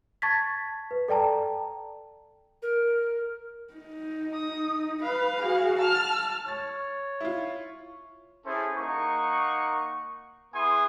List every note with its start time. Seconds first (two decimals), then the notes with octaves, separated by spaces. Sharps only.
0.22 A5 C#6 G#6 A6 B6
0.91 B4
1.08 A4 D5 G5 A5 A#5
2.62 A#4
3.74 D#4
4.34 D#6
5.03 B4 F5
5.40 F#4 G#4
5.79 A5 F6
6.48 C#5 A6
7.21 E4 F4
8.46 C#4 E4 G#4 A4 C5
8.77 A#3 D#4 F#5 C#6
10.54 B3 E4 G#4 G#5 C6 D#6